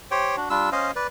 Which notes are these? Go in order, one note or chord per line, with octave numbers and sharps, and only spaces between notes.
G4 C5 C#5 G5
D4 F#4
G3 D4 F4 E6
C#4 C5 D#5 F5
B4 D5